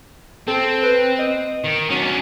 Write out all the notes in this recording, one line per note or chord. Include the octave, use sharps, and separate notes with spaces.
C4 A4
B4
D#5
D#3
F#3 C#4 D4